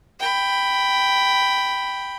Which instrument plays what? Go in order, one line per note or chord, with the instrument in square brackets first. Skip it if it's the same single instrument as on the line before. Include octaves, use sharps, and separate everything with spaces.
[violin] G5 B5